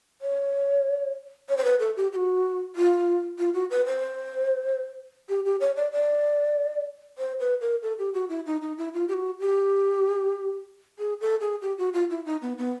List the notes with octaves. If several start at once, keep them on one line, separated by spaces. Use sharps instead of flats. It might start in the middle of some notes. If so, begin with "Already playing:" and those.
C#5
C#5
C5
B4
A4
G4
G4
F#4
F4
F4
F#4
B4
C5
G4
G4
C#5
D5
D5
C5
B4
A#4
A4
G4
F#4
E4
D#4
D#4
E4
F4
G4
F#4
G4
G#4
A4
G#4
G4
F#4
F4
E4
D#4
B3
B3